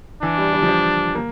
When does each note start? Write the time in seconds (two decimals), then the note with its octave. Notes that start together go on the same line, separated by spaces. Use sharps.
0.22 E3 D4
0.38 G3
0.53 G3
0.63 F3
0.68 G3
1.15 A#3